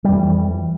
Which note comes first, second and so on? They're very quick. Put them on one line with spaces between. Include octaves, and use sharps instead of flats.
G3 F2 E3